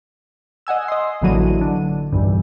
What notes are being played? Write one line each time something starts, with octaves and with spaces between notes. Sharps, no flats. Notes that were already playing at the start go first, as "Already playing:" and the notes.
D#5 F#5 G#5 E6
D#5 C6
A1 A#2 D3 E3 F#3 D#7
D3
B1 E2 G2